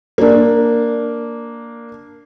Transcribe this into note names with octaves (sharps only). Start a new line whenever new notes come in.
A#3 D4